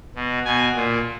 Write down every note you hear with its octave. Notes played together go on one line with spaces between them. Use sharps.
B2
B2 G#5
A#2